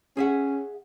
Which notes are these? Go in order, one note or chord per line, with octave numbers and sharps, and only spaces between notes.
C#4 G#4 E5 F#5